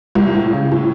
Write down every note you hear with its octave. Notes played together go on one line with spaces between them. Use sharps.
C2
A2
C#3
A2